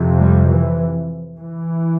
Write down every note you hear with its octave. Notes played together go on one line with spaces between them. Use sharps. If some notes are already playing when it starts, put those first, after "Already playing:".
Already playing: F2 C3
G3
E3
E3